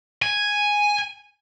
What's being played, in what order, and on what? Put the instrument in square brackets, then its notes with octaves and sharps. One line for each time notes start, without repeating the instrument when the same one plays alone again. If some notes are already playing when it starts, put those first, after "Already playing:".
[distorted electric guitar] G#5